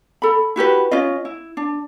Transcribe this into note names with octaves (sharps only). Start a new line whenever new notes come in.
A4 B5
E4 F#4 G4 B4
C#4 F4 D#5
E4
D4